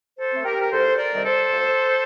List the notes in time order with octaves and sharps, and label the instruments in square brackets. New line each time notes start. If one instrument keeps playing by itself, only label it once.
[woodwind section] A4 C5
A3 C4
G4 A#4
A#4
D2 A4 C5
A#4 D5
C3 D#3 G3 C4
A4 C5
D2